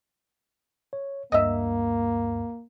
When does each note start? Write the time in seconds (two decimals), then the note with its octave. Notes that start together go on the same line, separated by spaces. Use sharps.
0.93 C#5
1.32 D2 G2 A#3 D#5 E5